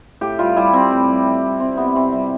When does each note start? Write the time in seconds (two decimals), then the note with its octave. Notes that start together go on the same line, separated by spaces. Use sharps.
0.21 A2 G4
0.39 G3 F4
0.56 G3 E4
0.73 G3 C4
0.92 A2
1.09 G3
1.26 G3
1.43 G3
1.60 C3 C4
1.77 C3 B3
1.95 C3 C4
2.12 G3